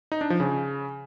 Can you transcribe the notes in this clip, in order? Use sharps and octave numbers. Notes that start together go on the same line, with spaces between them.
D#4
D4
F3
C#3